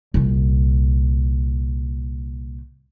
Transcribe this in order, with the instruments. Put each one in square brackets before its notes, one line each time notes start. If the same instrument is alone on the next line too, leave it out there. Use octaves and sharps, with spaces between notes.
[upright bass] C2 A#2